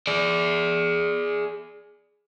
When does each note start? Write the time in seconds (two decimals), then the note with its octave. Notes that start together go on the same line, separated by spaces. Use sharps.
0.07 G#4 D5